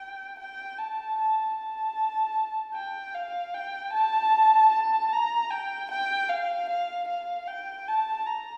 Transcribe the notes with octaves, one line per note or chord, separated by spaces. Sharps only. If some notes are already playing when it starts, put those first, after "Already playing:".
Already playing: G5
G5
A5
A5
A5
G5
F5
G5
A5
A5
A#5
G5
G5
F5
F5
F5
G5
A5
A#5